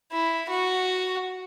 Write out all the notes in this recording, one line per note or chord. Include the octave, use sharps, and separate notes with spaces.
E4
F#4